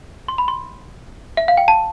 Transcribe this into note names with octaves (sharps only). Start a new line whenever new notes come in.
C6
B5
C6
E5
F5
G5
A5